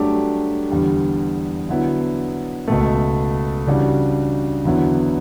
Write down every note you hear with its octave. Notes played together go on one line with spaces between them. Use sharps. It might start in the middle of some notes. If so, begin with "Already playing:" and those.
Already playing: G2 F#3 A3 D4 G4
E2 D3 G3
D3 F#3 B3 E4
C#2 B2 A3
C#3 E3 G3 D4 F#4
E2 D3 F#3 B3 E4